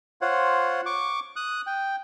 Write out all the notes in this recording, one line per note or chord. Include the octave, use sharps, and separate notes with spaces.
F4 C5 C#5 F#5
C#6 D6
D#6 F#6
G5